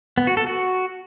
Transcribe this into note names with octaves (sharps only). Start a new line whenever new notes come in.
B3
F#4
A4
F#4